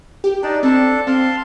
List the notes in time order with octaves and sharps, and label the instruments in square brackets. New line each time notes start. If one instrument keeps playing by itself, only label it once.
[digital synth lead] G4
[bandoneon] D4 D#4 D5 [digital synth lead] A5
[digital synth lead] C4 [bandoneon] D4 A4 A5
[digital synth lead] C4 [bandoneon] F5 A5 C6